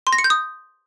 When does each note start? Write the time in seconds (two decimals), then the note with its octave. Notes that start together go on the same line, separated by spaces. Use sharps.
0.07 C6
0.13 A#6
0.18 C#7
0.24 G6
0.30 D#6